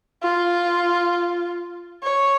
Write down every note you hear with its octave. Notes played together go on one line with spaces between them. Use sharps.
F4
C#5